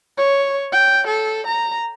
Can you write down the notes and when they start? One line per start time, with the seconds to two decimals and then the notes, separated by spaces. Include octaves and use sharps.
0.17 C#5
0.72 G5
1.07 A4
1.47 A#5